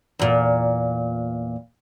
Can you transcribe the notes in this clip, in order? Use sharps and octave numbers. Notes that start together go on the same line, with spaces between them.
E2 A#2